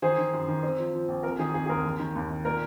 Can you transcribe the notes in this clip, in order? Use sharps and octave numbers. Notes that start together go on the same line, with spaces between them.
D#3 G#4 C5
D#3
F#2
D#3
C4
F3
F3
A#1
F1 A#4
D#3 G#4
F1 G#4
G#4
D#2 A#4
D#2
D#3
D#2
D#3
A#2 A#4